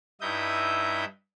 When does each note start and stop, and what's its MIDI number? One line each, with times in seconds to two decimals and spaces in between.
0.21 1.05 43
0.21 1.05 63
0.21 1.05 64
0.21 1.05 76
0.21 1.05 87
0.21 1.05 91